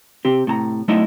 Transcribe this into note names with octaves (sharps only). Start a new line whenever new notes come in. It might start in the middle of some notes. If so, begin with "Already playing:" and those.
C3 C4 G4
A2 C3 A5 A#5
F#3 A3 D#4 E4 D#5 E5